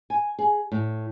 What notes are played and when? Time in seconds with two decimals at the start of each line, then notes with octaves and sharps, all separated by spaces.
0.10 G#5
0.39 G#4
0.72 A2